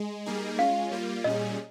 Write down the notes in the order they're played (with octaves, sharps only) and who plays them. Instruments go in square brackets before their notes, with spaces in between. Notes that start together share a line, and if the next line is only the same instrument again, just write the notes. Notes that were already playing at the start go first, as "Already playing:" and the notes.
Already playing: [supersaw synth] G#3
G3 A#3 D#4 G#4
[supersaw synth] G#3 C#4 F4 [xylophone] F5
[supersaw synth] G3 A#3 F4
[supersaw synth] A#2 G3 C#4 G#4 [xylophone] D#5